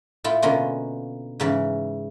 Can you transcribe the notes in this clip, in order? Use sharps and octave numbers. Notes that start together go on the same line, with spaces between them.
A2 E4 F4
B2 D3 A#3 C#4 F4
G#2 C#3 E3